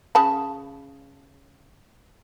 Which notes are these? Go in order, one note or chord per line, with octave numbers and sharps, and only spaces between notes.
C#3 A5 B5